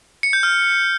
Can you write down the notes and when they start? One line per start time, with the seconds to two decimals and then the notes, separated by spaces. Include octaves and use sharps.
0.23 C#7
0.33 G6
0.43 F6